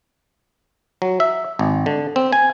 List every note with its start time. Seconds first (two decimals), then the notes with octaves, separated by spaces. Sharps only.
1.02 F#3
1.20 E5
1.59 G#1
1.86 D3
2.16 C4
2.32 G#5